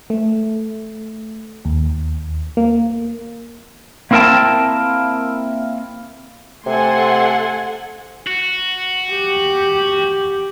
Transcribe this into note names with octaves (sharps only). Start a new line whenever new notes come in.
A3
D#2
A#3
A#3 C4 E4 A#4 G5 A5
C3 A3 A4 F#5 G#5 C6
F#4
G4